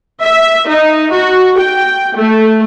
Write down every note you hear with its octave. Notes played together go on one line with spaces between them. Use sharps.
E5
D#4
F#4
G5
A3